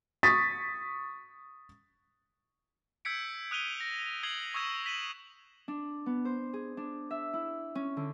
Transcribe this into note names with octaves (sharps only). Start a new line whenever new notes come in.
C#6 D#6 A6 B6
E6 G6 G#6 B6 C#7 D7
D#6 F#6 D#7 F7 G7
A#6
D#6 G#6 C7 F#7 G7
C#6 D#6 E6 G#6 E7
B6 D#7 E7 F#7
D4
B3
C5
G#4
D4
E5
E4
C#4
D3